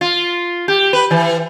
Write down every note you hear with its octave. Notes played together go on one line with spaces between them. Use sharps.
F4
G4
B4
E3